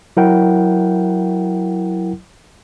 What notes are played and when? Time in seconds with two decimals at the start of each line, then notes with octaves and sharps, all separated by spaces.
0.17 F#3 E4 A#4 F#5 G5